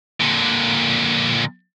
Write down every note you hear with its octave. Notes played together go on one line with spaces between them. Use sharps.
A#2 D3